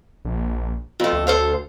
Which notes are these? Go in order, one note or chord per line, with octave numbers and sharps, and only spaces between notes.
A#1
F2 A3 F4
D2
A4 C5 F5